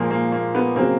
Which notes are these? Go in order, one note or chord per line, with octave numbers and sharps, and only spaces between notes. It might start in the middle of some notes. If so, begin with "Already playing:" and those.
Already playing: A#2 F3 G#3 A#3
A#3
A#3
B3
C#3 F#3 A#3 C4